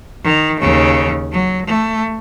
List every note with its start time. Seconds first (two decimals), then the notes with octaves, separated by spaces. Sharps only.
0.24 D#3
0.61 D#2 C#3
1.32 F#3
1.66 A3